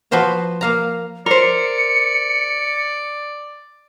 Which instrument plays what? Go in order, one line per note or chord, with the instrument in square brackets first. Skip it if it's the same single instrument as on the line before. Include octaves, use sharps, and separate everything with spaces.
[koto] F3 F#4 B4 C5 A#5
A#3 F5 A#5
[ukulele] A#4 C5 [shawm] D5 [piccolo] C#7